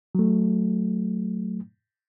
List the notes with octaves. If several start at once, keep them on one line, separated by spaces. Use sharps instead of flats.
F#3 A3